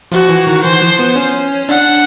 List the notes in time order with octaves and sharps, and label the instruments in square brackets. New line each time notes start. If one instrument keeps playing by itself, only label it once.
[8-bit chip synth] F3 [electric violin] F#4
[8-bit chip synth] E3
D#3
[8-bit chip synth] E3 [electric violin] C5
[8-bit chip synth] F3
B3
C#4
[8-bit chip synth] D4 [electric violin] F#5